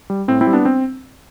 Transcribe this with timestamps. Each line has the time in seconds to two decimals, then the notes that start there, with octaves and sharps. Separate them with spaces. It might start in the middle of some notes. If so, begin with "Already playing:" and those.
0.10 G3
0.28 A2 C4
0.41 C4 E4
0.47 G3
0.53 B3 D4
0.65 C4